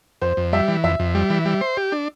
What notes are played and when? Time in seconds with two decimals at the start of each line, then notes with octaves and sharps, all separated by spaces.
0.22 F2 C5
0.37 F2
0.53 G3 E5
0.68 E3
0.84 F2 E5
0.99 F2
1.15 G3
1.30 E3
1.45 G3
1.61 C5
1.77 G4
1.92 D4